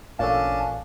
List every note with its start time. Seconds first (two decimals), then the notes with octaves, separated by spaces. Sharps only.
0.19 A1 A#2 C#4 D4 A4 F5 A5